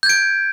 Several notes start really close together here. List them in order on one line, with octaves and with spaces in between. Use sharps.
G6 G#6 D7